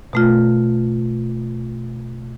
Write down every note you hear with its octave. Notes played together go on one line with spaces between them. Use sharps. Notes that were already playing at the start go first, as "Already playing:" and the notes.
B2 A3 F4